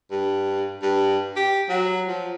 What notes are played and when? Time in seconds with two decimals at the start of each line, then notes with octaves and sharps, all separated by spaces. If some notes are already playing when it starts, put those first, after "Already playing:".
0.11 G2
0.82 G2
1.36 G4
1.69 F#3
2.07 F3